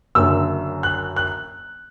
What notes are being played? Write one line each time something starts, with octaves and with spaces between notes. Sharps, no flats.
F#1 F#2 D3 E6
F#6
F#6